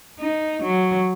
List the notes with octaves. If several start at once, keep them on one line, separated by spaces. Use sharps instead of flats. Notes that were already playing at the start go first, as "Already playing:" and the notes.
D#4
F#3